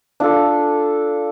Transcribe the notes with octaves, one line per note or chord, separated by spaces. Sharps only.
D4 F4 A4 F5